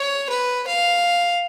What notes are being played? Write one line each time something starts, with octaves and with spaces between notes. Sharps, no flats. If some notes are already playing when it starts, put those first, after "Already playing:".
Already playing: C#5
B4
F5